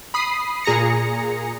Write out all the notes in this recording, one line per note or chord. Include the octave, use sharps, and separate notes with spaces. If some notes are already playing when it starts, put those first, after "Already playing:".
B5 D#6 C7
A#2 G#4 A#5 A#6 C#7